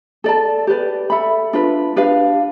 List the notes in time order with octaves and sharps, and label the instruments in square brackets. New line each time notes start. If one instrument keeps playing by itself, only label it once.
[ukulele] A4 D5 A5
G4 B4 D5
A4 E5 B5
D4 F4 B4
D4 G4 B4 F5